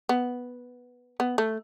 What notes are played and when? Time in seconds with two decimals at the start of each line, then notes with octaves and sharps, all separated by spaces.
0.09 B3
1.20 B3
1.38 A3